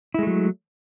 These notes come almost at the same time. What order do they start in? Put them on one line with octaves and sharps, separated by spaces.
E4 G#3 A3 F#3